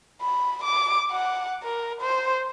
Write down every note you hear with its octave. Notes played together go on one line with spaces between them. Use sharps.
B5
D6
F#5
A#4
C5